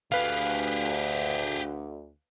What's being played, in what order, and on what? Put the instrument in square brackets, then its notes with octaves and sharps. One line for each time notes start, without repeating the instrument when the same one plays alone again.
[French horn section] D2 [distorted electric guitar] G4 G#4 [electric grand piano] B4 F5